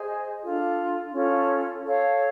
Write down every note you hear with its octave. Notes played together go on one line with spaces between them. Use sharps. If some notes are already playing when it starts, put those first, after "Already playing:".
Already playing: G#4 C5 D#5 G#5
D4 F4 A4
C#4 F4 A4
A4 C#5 F5